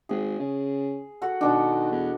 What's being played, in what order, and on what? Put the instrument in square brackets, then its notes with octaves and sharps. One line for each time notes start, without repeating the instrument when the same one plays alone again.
[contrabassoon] G#1 [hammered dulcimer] G#4
[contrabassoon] C#3
[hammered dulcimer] F#4 A4 F#5
[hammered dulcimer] B2 D4 [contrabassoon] D#3
[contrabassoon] E2